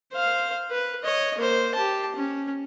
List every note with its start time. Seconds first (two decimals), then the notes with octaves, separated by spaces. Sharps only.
0.13 C5 F5
0.71 B4
1.03 C#5 D#5
1.38 A#3 C5
1.75 G4 A5
2.16 C#4